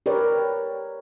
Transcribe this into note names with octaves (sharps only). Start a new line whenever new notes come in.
G4 A#4 B4 C#5 D5